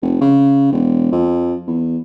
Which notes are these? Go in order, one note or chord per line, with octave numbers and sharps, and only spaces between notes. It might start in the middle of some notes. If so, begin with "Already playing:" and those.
F1
C#3
E1
F2
E2